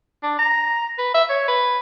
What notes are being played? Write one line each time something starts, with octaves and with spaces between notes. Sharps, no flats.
D4
A#5
B4
E5
C#5
B4